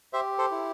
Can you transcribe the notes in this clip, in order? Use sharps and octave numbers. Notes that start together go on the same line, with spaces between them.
G4 C5 E5
A4 C5
E4